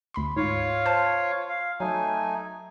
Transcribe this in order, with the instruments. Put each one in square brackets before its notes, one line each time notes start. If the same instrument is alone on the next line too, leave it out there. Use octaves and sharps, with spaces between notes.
[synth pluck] D2 B5 C6
[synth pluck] G#2 [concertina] F4 C#5 F5
[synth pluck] C5 A5
[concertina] F5
[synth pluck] F#3 [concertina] A3 D#4 G#5